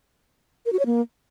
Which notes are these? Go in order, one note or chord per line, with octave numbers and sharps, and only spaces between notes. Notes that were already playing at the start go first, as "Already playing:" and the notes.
A#4
F#4
C#5
A#3